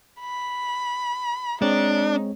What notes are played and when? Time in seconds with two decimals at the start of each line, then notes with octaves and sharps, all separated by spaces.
0.21 B5
1.62 G#3 C4 D4 D#4 C#5